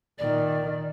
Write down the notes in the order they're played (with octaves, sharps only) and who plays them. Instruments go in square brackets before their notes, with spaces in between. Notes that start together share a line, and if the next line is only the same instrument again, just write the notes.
[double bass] A#2 D#3 [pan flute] D5